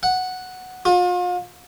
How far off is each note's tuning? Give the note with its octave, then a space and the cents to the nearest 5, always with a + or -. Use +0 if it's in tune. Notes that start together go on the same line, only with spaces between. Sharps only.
F#5 +0
F4 +40